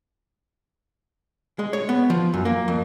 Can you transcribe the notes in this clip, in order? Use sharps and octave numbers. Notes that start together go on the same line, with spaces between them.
G#3
C#5
B3
F3
F#2
A#3
F2